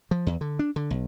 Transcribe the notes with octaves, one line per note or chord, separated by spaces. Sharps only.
F3
E2
D3
D4
D3
B1